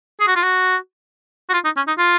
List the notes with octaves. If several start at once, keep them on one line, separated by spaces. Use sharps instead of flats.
G#4
F#4
F4
F#4
F#4
F4
D#4
C#4
D#4
F4